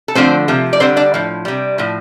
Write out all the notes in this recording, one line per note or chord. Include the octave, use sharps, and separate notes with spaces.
A4
D3 F3 A3 C4 C5
C3 F3 A3
D5
D3 G3 C4 C5
D4 D5
A2 F3
C3 G3
A2 F3